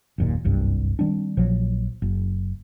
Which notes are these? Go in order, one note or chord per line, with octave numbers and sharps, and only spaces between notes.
F#1 D#2 A#2
F#1 C2 G2
D#3 G3 C4 D4
A#1 A#2 F3 F#3
F#1